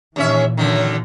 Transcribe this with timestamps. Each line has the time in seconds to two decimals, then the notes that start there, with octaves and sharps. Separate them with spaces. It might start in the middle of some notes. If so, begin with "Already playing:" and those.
0.16 D#2 A#2 E3 C#4 E5
0.57 F#2 D3 D#3